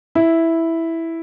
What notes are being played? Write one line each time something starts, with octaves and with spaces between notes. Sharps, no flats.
E4